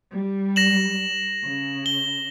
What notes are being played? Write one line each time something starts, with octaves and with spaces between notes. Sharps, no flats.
G3
A#6 E7 F#7
C#3
G7